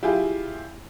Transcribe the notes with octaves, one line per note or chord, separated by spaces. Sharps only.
E4 F4 G4 G#4